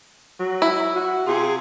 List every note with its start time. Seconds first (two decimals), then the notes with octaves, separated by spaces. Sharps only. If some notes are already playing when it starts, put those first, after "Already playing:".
0.39 F#3
0.62 E4
0.95 F#4
1.26 C3 F4 G#4